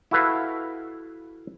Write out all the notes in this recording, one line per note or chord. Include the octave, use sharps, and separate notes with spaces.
E4 F#4 A4 B4 F5